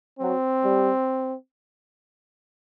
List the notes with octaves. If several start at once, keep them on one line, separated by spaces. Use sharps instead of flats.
F#3 C4
G3